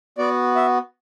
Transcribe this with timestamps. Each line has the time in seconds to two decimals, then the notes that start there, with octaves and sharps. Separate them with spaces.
0.18 B3 F#4 D5
0.55 E5